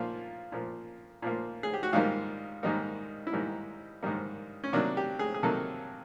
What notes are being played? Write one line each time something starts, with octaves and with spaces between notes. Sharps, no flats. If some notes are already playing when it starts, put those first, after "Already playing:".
Already playing: A#2 F3 A#3 F4
A#2 F3 A#3
A#2 F3 A#3
G#4
G4
F#4
G#2 D#3 G3 A#3 F4
G#2 D#3 G3 A#3 D#4
E4
G#2 D#3 G3 A#3 D#4
G#2 D#3 G3 A#3
C#4
C3 D#3 F#3 A#3 D4
G4
G#4
G#4
C3 D#3 F#3 A#3 A4